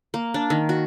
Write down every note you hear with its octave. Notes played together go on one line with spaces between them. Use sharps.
A#3
D4
D#3
F#4